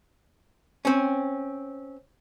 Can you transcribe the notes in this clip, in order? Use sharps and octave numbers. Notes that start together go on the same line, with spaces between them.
C4 C#4